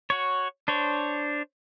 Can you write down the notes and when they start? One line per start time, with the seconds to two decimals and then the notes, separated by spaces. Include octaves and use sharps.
0.10 F#4 C#5
0.68 D4 C5 C#5